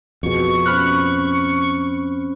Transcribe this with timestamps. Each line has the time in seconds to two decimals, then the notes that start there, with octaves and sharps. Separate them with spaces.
0.23 F2 B2 F#4 G#4 C#6
0.66 C4 C#4 C5 B5 F6 F#6